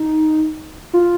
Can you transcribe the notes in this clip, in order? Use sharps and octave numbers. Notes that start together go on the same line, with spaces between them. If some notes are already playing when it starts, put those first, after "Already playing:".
Already playing: D#4
F4